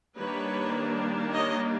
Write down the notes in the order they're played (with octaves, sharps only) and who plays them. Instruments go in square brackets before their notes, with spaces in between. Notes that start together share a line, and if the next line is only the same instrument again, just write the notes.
[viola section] D#3 G3 A#3 D4 B4 C#5
C#5 D#5